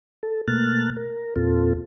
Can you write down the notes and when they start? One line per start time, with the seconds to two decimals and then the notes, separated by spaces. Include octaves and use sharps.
0.23 A4
0.48 B2 A3 A#3 F6 F#6 A6
0.97 A#4
1.36 E2 A#2 C4 F4 A4